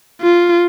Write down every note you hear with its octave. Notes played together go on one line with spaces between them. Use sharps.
F4